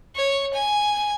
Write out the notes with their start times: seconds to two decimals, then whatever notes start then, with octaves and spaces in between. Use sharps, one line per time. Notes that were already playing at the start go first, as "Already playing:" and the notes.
0.15 C#5
0.53 G#5